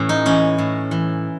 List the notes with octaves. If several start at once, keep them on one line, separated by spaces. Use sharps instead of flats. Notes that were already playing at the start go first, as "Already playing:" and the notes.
Already playing: A2 E3 C#4
D#4
E3 C#4
A2
E3